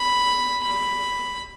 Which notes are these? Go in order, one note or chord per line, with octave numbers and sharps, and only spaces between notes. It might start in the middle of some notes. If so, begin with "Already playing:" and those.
Already playing: B5
B5